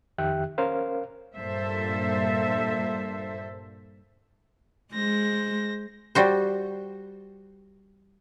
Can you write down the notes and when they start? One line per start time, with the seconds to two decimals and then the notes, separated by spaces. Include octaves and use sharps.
0.18 F2 D#3 G4 E5 G5 F#6
0.58 C#4 A#4 C5 F5
1.37 G2 A#2 A#3 A4 C5 E5
4.94 G#3 C5 A#6
6.15 G3 F#4 C5